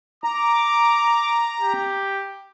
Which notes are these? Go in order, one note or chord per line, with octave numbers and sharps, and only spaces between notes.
A#5 D6
G4